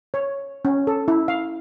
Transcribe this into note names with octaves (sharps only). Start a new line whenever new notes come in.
C#5
C#4
A4
E4
F5